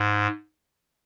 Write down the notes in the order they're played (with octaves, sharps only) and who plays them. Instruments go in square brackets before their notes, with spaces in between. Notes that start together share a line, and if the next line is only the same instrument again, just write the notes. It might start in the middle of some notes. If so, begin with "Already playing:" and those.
Already playing: [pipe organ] G#2